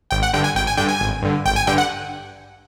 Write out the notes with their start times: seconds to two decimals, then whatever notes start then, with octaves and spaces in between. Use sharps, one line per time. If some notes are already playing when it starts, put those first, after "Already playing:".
0.11 G#1 G5
0.23 F#5
0.33 G2 D3 G5
0.44 G#5
0.55 G#1 G5
0.67 G#5
0.77 G2 D3 G5
0.89 G#5
1.01 G#1
1.22 G2 D3
1.46 G#1 G5
1.56 G#5
1.67 G2 D3 G5
1.78 F#5